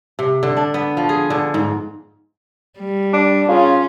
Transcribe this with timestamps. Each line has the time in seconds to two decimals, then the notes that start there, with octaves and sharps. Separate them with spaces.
0.19 C3
0.43 D3
0.57 D4
0.74 B3
0.97 F3
1.09 G#4
1.30 D3
1.54 G#2
2.79 G3
3.13 D4
3.49 C#3 C#4 F4